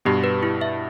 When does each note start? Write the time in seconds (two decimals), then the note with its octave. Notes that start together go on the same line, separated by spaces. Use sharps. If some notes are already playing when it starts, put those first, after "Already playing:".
0.05 G2 B2 G4
0.24 B4
0.43 E4
0.61 E5